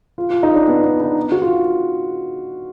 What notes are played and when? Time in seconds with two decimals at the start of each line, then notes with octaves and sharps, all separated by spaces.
0.18 F4
0.30 F4
0.43 D#4
0.55 D4
0.68 B3
0.84 D4
1.00 D#4
1.32 F#4
1.42 F4